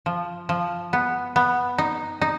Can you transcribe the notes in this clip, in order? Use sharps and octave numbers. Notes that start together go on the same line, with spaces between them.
F3
F3
B3
B3
D#4
D#4